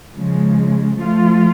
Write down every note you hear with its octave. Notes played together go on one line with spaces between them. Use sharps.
C#3 F3 G#3
F3 A3 F4